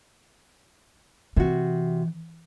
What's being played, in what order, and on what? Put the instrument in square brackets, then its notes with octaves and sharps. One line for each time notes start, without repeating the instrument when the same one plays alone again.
[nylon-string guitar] C3 F#4 [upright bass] E3